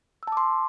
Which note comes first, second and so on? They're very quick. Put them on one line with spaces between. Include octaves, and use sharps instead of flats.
E6 A5 D6 C6